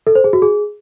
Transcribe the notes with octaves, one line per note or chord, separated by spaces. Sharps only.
A4
C5
G#4
F#4
G#4